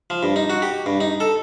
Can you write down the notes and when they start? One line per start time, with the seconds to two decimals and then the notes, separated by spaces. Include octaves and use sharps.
0.10 F3
0.23 G2
0.36 D#4
0.50 F#4
0.62 G4
0.86 G2
1.00 D#4
1.20 A4